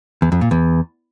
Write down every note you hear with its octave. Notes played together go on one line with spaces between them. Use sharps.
E2
F2
A#2
E2